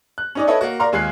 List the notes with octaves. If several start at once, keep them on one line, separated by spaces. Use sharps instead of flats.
F#6
C#4 D#4 D5
E4 A4 B4 C#5 D#5
A#3 F#4
A#4 D5 F5 A#5 C6
D#2 G#3 F4 F#6 C7